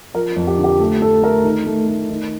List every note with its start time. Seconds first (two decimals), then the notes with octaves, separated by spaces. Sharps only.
0.14 F3 A#4
0.36 F2
0.47 G4
0.58 D3
0.64 G4
0.80 A3
1.02 A3 A4
1.23 A3 A#4
1.44 D#3
1.67 A3
1.88 A3
2.10 D#3